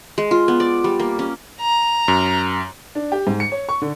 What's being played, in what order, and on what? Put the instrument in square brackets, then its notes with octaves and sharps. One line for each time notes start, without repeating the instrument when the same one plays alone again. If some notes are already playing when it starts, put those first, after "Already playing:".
[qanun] G#3
F4
B3
D5
G3
A#3
C#4
[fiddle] A#5
[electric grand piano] F#2
[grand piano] D4
G4
G#2
C#7
C#5
C#6
D3